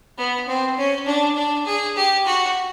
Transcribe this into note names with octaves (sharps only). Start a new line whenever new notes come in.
B3
C4
C#4
D4
D4
G#4
G4
F#4